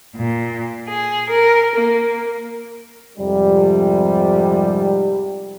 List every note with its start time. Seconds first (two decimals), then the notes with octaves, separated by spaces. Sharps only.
0.15 A#2
0.90 G#4
1.32 A#4
1.77 A#3
3.19 F2 G#2 C3 G3